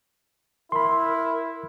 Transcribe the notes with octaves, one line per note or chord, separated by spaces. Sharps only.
E4 A#4 B5 C6